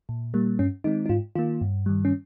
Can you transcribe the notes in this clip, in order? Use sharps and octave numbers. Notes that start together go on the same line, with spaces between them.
A#2
G3 A#3
G2 C#4
D#3 G#3 C4 D#4
D#4
G#2 F4
D#3 A#3 F4
G2
D#3 G3
C#4